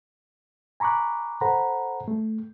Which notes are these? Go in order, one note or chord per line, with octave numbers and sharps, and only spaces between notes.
G#5 A#5 B5 C#6 D6 F#6
A4 C5 F#5 A#5 B5
A3